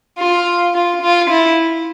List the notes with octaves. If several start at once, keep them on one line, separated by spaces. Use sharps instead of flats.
F4
F4
F4
E4